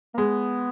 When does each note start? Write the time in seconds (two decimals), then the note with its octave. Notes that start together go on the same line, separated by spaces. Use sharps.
0.14 A#3
0.18 G#3 B3